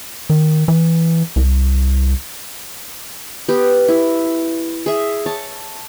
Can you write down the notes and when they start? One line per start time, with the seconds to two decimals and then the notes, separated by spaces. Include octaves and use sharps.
0.30 D#3
0.68 E3
1.36 C2
3.49 B3 G4
3.88 E4
4.86 G#4 E5
5.26 C#5 A5